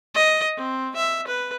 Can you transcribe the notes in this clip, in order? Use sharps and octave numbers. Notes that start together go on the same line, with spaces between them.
D#5
C4
E5
B4